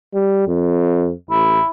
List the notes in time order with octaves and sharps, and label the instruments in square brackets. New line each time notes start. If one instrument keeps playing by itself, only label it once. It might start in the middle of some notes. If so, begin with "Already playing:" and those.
[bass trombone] G3
F2
[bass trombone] A1 [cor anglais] E4